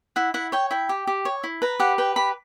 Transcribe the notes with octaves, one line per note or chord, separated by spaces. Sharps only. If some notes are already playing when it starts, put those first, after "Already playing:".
E4 F#5
E4 F#5
C#5 G5
E4 G5
G4
G4
C#5
E4
B4 A#5
G4 F#5
B4 G5
G4 B5